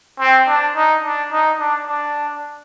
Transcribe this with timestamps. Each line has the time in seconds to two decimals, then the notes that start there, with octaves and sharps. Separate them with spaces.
0.20 C4
0.48 D4
0.76 D#4
1.04 D4
1.32 D#4
1.59 D4
1.88 D4